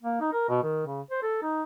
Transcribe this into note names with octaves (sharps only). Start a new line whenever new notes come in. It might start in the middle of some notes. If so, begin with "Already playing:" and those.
A#3
D#4
A#4
B2
D#3
C#3
C5
A4
D#4